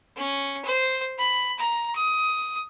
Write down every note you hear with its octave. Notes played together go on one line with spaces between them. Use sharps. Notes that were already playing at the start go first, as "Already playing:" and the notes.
C#4
C5
B5
A#5
D#6